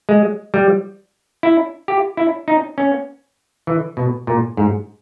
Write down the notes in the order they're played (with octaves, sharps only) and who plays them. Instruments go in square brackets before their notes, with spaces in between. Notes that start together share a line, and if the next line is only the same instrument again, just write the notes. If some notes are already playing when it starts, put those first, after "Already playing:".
[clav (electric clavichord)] G#3
G3
E4
G4
E4
D#4
C#4
E3
B2
A#2
G#2